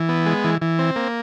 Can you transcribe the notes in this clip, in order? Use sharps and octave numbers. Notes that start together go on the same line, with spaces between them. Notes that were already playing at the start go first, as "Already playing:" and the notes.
Already playing: E3
B3
G#3
E3
E3
C4
A#3